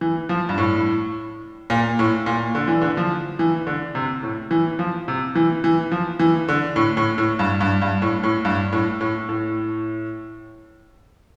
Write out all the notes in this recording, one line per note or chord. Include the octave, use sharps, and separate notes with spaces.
E3
F3
G2
A2
A#2
A2
A#2
D3
E3
D3
F3
E3
D3
C3
A2
E3
F3
C3
E3
E3
F3
E3
D3
A2
A2
A2
G2
G2
G2
A2
A2
G2
A2
A2
A2